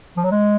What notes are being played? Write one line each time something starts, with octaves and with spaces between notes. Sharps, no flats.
F3
F#3
G#3